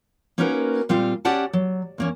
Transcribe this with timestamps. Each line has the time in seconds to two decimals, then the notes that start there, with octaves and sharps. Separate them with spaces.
0.38 A#3 C#4 D#4 F#4 A#4 B4
0.89 A#2 G3 C4 F4 F5
1.25 C#4 G4 D5 F#5 A5
1.53 F#3
1.98 E2 A#3 C#4